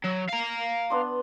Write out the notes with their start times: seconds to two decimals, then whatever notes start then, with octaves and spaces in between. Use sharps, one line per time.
0.04 F#3
0.29 F5 A#5
0.90 B3 D4 C6